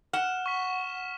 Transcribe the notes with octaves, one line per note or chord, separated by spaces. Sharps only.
F#5 F6 E7
C#6 B6